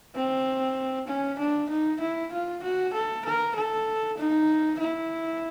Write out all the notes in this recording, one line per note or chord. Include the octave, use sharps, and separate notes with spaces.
C4
C#4
D4
D#4
E4
F4
F#4
A4
A#4
A4
D#4
E4